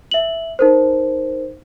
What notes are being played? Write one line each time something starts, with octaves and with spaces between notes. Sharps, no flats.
E5 F#7
D#4 A#4 C5